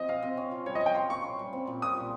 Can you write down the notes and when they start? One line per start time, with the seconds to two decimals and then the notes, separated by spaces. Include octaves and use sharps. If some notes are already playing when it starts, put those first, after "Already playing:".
Already playing: F3 C4 D#5
0.09 C3 F5
0.22 C3
0.37 C#4
0.51 F4
0.66 G3 C#5
0.75 D#5
0.81 G3 G5
0.95 F4 C6
1.10 A#3 C#6
1.24 C#4
1.39 G3
1.53 C4
1.67 A#2
1.82 A#2 D#6
1.97 A#2